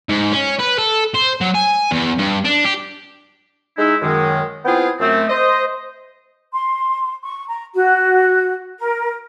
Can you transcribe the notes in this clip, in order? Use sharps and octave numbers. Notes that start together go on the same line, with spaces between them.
G#2
C#4
B4
A4
C5
F#3
G#5
E2
G2
D4
G4
G#3 D#4 E4
F#2 D#3 G#3
B3 C4 E4 F4 G#4 G5
F#2 A3 C4
C5 D#5
C6
C#6
A#5
F#4
A#4